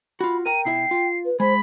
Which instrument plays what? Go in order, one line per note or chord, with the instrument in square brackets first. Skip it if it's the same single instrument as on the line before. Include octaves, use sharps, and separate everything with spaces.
[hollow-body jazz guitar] F4 F#4 [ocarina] B5
[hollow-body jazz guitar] A#4 A#5 [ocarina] G5 [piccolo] D#7
[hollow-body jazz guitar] B2 E4 E5 [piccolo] C7
[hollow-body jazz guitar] F4
[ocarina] B4
[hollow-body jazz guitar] G#3 [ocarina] C5 [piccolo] B5